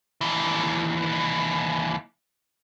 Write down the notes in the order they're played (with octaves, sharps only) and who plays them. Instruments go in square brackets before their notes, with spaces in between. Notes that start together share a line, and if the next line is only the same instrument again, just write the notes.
[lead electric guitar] D#2 E3